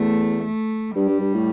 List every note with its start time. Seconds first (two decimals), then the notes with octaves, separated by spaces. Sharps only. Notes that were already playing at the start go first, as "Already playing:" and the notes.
Already playing: E2 A3
0.44 A3
0.95 G2 G3
1.08 G2
1.21 G2
1.34 A2